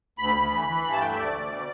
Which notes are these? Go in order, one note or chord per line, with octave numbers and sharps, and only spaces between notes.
D2 B5
D2
E3
E3
G2 B5
A5
A3 G5
E5
D2 D5
D2
B2